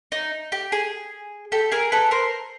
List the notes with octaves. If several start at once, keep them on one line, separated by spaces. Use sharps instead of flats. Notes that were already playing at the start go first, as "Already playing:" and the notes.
D#4
G4
G#4
G4 A4
G#4 A#4
A4 B4
A#4 C5